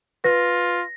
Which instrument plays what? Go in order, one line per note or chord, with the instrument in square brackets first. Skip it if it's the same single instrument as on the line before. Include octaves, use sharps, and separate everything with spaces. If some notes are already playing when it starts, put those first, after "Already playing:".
[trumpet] F4 [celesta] B4 [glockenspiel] A#6